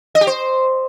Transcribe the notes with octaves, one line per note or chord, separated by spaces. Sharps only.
D#5
G4
C5